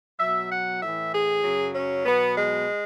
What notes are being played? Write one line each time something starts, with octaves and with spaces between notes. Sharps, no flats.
B2 F#3 E5
F#5
A2 E3 E5
G#4
F#2 C#3 F#3
C#4
B2 F#3 B3
G#3